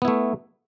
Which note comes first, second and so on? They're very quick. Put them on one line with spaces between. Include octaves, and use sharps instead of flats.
B3 E4 A3